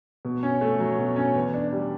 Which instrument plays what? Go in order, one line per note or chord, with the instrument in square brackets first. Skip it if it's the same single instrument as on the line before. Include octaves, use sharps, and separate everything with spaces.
[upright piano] B2
C#4
A3
F#3
B2
C#4
E2
D4
G3